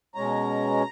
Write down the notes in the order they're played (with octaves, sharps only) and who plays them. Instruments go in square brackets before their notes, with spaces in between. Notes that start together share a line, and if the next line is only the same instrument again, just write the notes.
[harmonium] B2 G#3 C#4 A#5